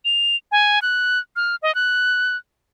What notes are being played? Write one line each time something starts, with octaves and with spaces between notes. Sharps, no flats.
F7
G#5
F#6
F6
D#5
F#6